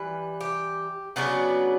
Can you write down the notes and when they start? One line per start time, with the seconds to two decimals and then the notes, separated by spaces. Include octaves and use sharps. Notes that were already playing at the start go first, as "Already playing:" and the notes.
Already playing: E3 G3 B4
0.41 G4
1.16 C#3 F#3 B3 D4 F#4